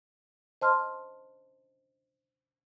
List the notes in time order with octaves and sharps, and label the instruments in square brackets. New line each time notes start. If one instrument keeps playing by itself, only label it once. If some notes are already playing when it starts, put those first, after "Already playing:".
[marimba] C5 D#5 A5 C6 F6